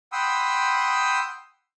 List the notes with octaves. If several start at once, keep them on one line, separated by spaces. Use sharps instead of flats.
F#5 G5 B5 C6 D#6 E6